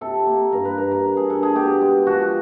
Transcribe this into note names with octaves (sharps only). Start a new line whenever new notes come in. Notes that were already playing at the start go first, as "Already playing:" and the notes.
C3 A4
A#3
G2 A#4
B4
G2 A#4
A#4
D4
G#4
D4 A4
G#4
B2 G4
G#3
F3 F#4